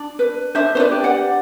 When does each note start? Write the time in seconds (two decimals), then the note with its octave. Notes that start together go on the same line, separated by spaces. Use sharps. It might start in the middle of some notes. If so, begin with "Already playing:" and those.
Already playing: D4 D5
0.19 B4
0.55 D4 C5 E5
0.75 C5
0.80 B4 D5
0.91 G4
1.04 D5 F#5